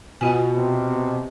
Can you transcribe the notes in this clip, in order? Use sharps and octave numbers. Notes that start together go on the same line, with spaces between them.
B2 F4 G#5
C3